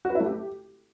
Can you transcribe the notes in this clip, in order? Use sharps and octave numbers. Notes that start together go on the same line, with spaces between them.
F#4
B4
E4
A3
G4